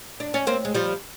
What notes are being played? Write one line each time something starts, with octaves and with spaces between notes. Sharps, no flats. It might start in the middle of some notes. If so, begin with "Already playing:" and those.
D4
C#4
A#3 C4
G#3
F3 G3